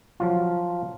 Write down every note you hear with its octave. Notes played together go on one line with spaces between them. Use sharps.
F3 F#3 F4